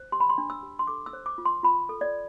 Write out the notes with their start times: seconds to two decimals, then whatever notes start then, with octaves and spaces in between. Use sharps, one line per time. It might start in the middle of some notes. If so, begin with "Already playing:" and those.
Already playing: C5
0.12 G4 C6
0.20 B5
0.30 C6
0.38 D4
0.50 E6
0.63 G4
0.79 C6
0.87 A4 D6
1.06 E6
1.13 C5
1.26 D6
1.38 F4
1.45 C6
1.63 F4 B5
1.89 A4
2.01 D5